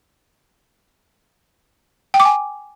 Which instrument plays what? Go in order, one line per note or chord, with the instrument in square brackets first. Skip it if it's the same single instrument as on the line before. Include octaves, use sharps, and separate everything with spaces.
[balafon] G5
D6
G#5